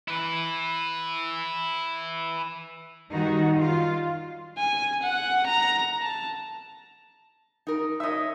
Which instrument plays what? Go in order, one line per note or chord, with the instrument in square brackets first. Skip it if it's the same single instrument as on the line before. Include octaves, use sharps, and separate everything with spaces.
[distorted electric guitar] E4 B4
[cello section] D#3 G3 D#4 F#4
F4
[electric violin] G#5
F#5
A#5
A5
[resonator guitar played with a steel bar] D#4 A#4
[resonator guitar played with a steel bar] D#4 C#5 [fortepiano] D#5 E5